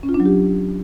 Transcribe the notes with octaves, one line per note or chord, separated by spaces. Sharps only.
C#4
F4
D4
F#3
G4